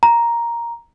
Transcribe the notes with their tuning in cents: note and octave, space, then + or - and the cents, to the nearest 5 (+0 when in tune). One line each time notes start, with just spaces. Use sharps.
A#5 +5